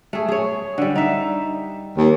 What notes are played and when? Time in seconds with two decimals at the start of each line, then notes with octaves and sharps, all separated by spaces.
0.13 A3 G#4
0.28 G#4 C#5
0.78 D3 G3
0.96 D#4 E5
1.98 D#2